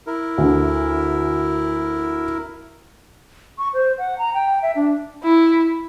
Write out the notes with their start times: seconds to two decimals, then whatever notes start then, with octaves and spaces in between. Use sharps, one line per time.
0.07 E4 A#4
0.38 D2 D3
3.58 C#6
3.74 C5
3.98 F#5
4.18 A#5
4.34 G5
4.62 E5
4.76 D4
5.24 E4